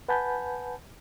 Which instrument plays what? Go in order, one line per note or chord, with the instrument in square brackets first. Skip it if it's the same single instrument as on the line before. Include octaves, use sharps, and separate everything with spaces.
[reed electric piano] B4 F#5 G#5 A5 B5 G6